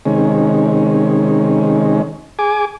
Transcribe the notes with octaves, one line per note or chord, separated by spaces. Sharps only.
C3 D#3 G#3 C#4
G#4 G#5 D6